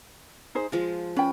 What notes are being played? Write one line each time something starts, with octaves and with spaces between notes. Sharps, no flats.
D#4 G#4 C5
F3 G#3 F4
C#4 B4 G5